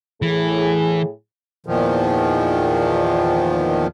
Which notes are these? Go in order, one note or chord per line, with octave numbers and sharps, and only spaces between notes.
A2 E3 G#4
E2 A#2 D#3 F3